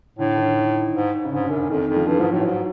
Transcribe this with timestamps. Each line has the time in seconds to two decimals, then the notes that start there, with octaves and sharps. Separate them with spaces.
0.18 A2 D3
0.38 D#3
0.56 D#3
0.94 G#2
1.25 C#3
1.32 G#2 D3
1.44 C#3
1.50 F#2
1.56 D3
1.70 F2 D#3
1.88 F2
1.96 F3
2.07 G2 E3
2.19 G#2 F3
2.32 A2 F#3
2.45 G#2